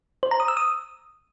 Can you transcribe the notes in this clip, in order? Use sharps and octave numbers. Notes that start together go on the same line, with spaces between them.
C5
A#5
D#6
E6
D#6